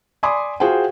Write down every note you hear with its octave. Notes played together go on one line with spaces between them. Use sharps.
D5 G#5 B5 C6 D6 D#6
F4 F#4 G#4 C5 F5 G5